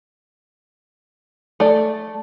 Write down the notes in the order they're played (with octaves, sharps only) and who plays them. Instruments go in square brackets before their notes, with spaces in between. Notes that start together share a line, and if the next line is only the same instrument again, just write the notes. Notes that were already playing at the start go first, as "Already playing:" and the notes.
[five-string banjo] A3 D5